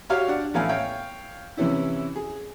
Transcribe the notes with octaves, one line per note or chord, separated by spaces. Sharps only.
F#4 G4 C#5 F5 F6
D4 F#5
A1 A2 B3 F5 G#5
C#5 F5 G5
C3 E3 C#4 E4
G#4